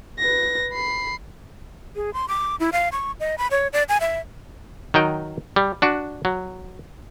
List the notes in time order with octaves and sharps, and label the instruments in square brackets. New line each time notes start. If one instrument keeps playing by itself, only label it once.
[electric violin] B4 A#6
B5 C7
[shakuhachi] G#4
C6
D6
E4
F5
C#6
D#5
B5
C#5
D5
G#5
E5
[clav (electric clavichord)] D#3 F#3 D#4 G5
G3
D4 F#4
F#3